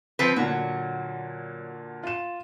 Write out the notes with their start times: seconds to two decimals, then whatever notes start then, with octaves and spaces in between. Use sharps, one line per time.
0.19 F3 C4 B4
0.36 A#2 D3 F#3 F#4
2.03 F4 E7